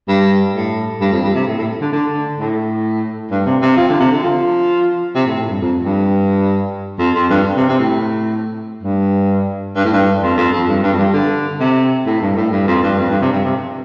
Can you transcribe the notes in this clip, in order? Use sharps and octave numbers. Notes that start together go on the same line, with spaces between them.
G2
A2
G2
F2
G2
C3
A2
A2
D3
D3
A2
G2
C3
C3
F3
D3
C3
D3
F3
C3
A2
A2
G2
F2
G2
F2
F2
G2
C3
C3
A2
G2
G2
A2
G2
F2
F2
F2
G2
G2
F2
G2
D3
C3
A2
G2
A2
G2
F2
G2
F2
G2
C3
G2
C3